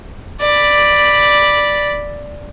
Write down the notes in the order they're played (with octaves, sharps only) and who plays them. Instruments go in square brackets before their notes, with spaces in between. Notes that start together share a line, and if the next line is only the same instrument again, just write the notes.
[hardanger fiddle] D5 B5